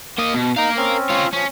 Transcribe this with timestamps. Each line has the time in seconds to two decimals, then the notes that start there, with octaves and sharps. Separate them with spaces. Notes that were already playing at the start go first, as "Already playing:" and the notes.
0.18 A#3 D#5
0.34 B2
0.57 D#4 A#4 F5
0.77 C4 C#4
1.10 F4 C#5
1.33 F3 C#4